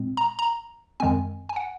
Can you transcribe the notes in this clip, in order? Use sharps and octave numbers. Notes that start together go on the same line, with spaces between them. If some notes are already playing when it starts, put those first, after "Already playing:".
Already playing: A#2 G#3 C4
A#5
A#5
F#2 D#3 G#3 C4 G#5
G#5
F#5